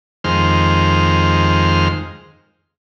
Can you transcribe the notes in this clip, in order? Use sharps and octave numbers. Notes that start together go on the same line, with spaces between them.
F2 D#3 G#3 C5 F6